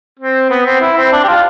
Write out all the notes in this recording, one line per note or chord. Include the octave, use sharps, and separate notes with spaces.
C4
B3
C4
E4
C4
D4
G4
F4